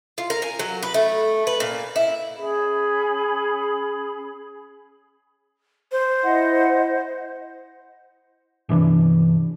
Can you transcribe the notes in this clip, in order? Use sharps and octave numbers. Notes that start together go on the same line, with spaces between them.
F4
A#4
G#5
F#3
B4
A3
B4
A#2
E4
C#4 G#4 B5
C5
E4 D#5 F#5
G1 C3 E3 D4